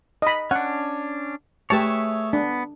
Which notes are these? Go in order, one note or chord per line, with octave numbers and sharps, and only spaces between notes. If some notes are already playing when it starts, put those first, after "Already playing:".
D#5 B5
C#4 D4 F#5
A3 G4 G#4 B4 C#5 E5 A5
B3 D4